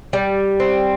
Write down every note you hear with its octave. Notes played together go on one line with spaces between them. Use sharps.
G3
C4